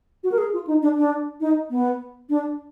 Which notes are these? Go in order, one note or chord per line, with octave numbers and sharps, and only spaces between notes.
F#4
A#4
G#4
F4
D#4
D4
D4
D#4
B3
D4